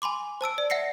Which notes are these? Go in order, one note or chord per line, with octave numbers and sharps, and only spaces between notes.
G#5 B5 C6 D6
C5 A5 E6 D7
D5
E5 F#5 A#6 C7 C#7